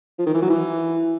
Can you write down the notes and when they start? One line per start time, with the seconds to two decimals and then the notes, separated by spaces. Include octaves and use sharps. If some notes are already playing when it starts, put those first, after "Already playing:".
0.19 F3
0.26 D#3
0.34 E3
0.42 F#3
0.50 E3